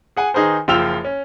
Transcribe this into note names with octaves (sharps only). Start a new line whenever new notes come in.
G#4 F#5 G#5
D#3 D#4 G#4 B4 C5
F#1 F3 F4 G5 E6 F7
C#4